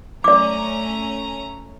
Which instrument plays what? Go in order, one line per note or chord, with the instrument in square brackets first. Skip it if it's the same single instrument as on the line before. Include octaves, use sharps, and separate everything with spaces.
[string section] A3 C#4 A#5 [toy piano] D5 D6